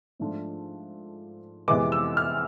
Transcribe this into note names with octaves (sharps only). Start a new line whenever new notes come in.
G#2 F3 A3 D4 F4
F2 C3 E3 G#3 B3 D6
E6
F6